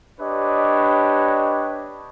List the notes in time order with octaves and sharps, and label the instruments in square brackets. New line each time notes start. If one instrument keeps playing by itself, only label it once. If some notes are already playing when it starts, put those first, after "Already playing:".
[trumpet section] D4 G4 B4 C#5 D#5